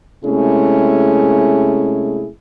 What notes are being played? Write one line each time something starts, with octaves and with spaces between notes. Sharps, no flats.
C3 G#3 A3 C#4 E4 G#4